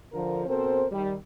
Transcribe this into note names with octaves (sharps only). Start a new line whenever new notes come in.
D3 F3 A#4
B2 C4 A4 A#4 C5
D#3 G3